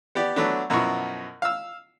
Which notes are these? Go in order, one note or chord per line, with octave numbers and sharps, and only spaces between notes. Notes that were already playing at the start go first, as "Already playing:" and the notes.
B3 G4 D5
F#3 A3 B3 D4
F#2 B2 F3 E4 C#6
F5 E6